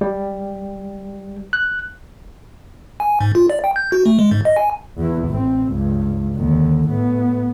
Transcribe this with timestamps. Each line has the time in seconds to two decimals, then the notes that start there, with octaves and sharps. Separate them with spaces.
0.01 G3
1.53 F#6
3.00 G#5
3.20 G#2
3.35 F4
3.50 D5
3.64 G5
3.76 G6
3.92 F#4
4.06 A3
4.19 G#3
4.31 G#2
4.45 D#5
4.56 G#5
4.97 E2 E4
5.29 A1 C4
5.71 C#2 G2
6.36 D#2 D3
6.88 A2 B3